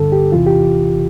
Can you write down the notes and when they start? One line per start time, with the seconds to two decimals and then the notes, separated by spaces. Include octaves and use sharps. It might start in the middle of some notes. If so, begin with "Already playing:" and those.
Already playing: G2 D3 A4
0.12 G4
0.32 E2 C3 E3 F4
0.46 G4